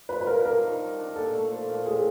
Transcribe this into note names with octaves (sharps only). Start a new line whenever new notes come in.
F3 B4
B4
F3 A#4
D4 A#4
D#3
G3
D4
A#2 A4
A3
F3
A#2
A2 G#4